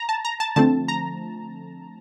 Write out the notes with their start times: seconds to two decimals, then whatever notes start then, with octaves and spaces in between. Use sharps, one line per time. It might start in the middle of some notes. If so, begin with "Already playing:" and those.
Already playing: A#5
0.09 A5
0.25 A#5
0.40 A5
0.56 D3 F3 A3 C4 A5
0.88 A#5